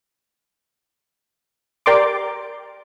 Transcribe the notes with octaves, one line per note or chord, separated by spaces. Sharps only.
G4 A#4 D5 C6 D6